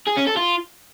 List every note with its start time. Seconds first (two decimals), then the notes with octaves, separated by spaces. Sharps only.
0.07 G#4
0.17 C#4
0.27 A4
0.37 F4